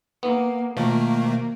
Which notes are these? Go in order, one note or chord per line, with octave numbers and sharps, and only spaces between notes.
A#3 B3
B2 D#3 F3 A3 A#3